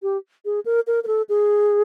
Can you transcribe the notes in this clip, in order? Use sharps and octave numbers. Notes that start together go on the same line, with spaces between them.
G4
G#4
A#4
A#4
A#4
A4
G#4